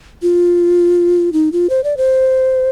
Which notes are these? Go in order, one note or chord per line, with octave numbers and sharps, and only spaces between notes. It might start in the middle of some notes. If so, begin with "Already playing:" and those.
F4
D#4
F4
C5
D5
C5